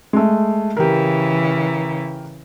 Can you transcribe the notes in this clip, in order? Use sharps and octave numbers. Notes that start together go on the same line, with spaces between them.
G#3 A3
C#3 E3 G4 A#4